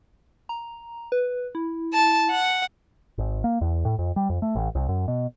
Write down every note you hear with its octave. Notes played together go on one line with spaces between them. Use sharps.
A#5
B4
E4
A5
F#5
G#1
A#3
E2
A2
F2
G3
F2
A3
A1
C2
F#2
B2